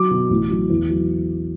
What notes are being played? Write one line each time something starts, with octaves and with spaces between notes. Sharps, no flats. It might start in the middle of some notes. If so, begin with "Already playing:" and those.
Already playing: F#3 D6
B2
A1
F#3
E2
F#3